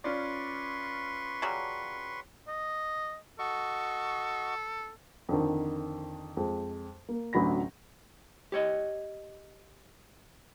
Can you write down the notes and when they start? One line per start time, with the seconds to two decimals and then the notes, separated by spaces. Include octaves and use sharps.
0.04 C#4 F4 B4 D5 C6 C#6
1.42 C#3 F#3 G3
2.48 D#5
3.39 F#4 A4 D#5 C#6
5.29 F2 D3 D#3
6.37 F2 G#3
7.09 A#3
7.33 A1 D2 F#3 B5 A#6
8.52 G4 C#5 D#5